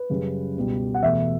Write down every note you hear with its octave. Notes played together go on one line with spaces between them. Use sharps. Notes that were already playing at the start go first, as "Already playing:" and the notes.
Already playing: B4
F#2 C#3 G3
C#2 B2 G3
F#5
E2 B2 A3 E5